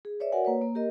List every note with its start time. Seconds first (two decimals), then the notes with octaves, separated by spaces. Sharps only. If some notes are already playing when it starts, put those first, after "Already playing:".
0.05 G#4
0.20 B4 C#5 D5 E5
0.32 F#4 A#4 D5 F#5 G#5
0.45 A#3 B4 C#5
0.62 A#3
0.75 G4 A#4 D#5